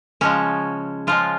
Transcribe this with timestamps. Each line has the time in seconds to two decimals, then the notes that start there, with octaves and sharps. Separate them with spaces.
0.21 C#3 F3 G#3 C#4
1.07 C#3 F3 G#3 F4